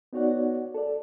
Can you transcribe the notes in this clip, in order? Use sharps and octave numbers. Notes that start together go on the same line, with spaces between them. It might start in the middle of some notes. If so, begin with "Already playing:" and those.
B3 D#4 F#4 C#5 D5 F#5
A4 D5